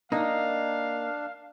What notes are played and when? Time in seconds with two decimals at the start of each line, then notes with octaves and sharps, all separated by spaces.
0.12 A#3 D4 D#4 F5